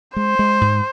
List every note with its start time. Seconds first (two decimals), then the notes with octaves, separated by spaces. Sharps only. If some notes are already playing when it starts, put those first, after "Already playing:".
0.16 G#3 C5
0.39 G#3
0.61 G#2